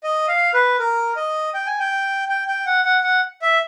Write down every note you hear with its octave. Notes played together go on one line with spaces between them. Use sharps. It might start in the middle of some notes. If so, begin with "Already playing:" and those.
D#5
F5
B4
A#4
D#5
G5
G#5
G5
G5
G5
F#5
F#5
F#5
E5